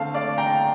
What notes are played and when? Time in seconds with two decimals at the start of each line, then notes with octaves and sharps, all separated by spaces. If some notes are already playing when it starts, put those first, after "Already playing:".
Already playing: D3 A3 C4 F5 A5
0.14 D5 F5
0.38 G5 A#5